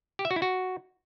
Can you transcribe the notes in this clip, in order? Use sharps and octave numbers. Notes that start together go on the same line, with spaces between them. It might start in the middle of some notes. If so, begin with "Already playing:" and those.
G4
E5
F#4
E4
F#4